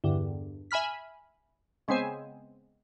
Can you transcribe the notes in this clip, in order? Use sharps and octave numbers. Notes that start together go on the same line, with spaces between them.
E2 G2 D3
E5 G#5 B5 F6 B6
C#3 G#3 B3 C4 C5 G#5